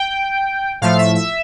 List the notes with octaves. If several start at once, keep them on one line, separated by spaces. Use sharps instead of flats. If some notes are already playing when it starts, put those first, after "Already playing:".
Already playing: G5
A2 F3 A3 F5
E5
E5